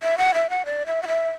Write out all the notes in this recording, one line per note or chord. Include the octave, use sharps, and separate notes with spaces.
E5
F#5
E5
F#5
D5
E5
F#5
E5